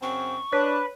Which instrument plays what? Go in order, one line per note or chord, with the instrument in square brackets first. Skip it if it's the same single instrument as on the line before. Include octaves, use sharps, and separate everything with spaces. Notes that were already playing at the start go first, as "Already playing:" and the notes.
[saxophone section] F#2 C#3 C4 [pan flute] C#6
[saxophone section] D4 [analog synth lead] B4 [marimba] C#5